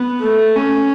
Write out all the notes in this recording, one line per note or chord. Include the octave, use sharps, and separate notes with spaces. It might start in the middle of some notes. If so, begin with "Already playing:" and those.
Already playing: B3
A3
C#4